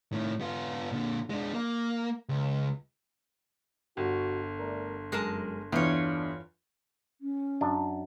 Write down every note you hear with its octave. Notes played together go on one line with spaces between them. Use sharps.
A2 D#3
B3 F4
A#2 D3
G#3 D4
A#3
C#2
G1 F#4
A3 A#4 D5
F#2 G#3 A#4 A5
E2 D4 F4 C#5
C#4
F#2 D4